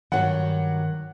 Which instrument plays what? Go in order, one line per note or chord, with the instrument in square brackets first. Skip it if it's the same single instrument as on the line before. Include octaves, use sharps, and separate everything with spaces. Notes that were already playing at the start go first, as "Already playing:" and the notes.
[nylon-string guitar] G2 F#3 F#4 [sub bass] D#3 [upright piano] F#5